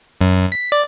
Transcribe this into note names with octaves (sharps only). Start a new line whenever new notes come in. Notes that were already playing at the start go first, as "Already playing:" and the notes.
F#2
B6
D5